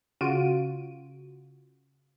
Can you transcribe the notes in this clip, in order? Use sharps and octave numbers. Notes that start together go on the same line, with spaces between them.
C#3 F4 F#4 D7 D#7